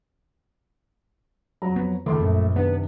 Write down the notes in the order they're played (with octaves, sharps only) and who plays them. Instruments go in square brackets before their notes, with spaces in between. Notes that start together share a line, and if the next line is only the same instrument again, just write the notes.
[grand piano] F2 A#5 [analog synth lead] F#3
[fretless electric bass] B3
[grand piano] C#2 C6 D6 [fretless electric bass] D#3 [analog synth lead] A3
[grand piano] A#1 A#4 [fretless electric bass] F#2
[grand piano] C3 D#3 D4 [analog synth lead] B3